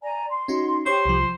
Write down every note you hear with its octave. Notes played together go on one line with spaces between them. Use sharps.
D5 G#5 A#5
C6
C#4 D#4 F#4
G4 C5 C#5 C#6
C2 F3